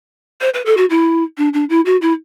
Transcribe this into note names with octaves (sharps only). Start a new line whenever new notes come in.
C5
B4
A4
F#4
E4
D4
D4
E4
F#4
E4